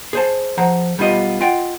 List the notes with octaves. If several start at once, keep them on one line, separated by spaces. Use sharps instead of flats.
G#4 C5 A5
F3 G#4 C5 F#5 A#5
B1 G3 B3 D4 F4 D#5
F4 D#5 F#5 G5